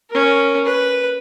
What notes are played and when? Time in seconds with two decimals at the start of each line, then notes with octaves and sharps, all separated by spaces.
0.10 C#4 A#4
0.64 B4